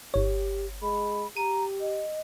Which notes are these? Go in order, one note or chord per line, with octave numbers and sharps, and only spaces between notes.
G1 G4 C#5
G#3 B5
G4 A#5 D#7
D#5